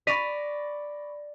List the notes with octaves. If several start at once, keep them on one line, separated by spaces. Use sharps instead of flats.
D5 B5 C#6 A#6 B6 D#7 F7